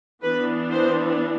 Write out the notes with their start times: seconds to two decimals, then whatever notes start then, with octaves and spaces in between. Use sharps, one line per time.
0.23 E3 B3 D4 B4
0.71 C5